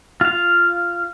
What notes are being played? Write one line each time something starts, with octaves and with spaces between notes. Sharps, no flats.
F4 F5